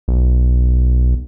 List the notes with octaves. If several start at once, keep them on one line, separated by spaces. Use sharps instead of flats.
B1